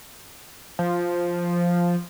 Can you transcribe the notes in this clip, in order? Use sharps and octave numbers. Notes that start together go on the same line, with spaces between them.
F3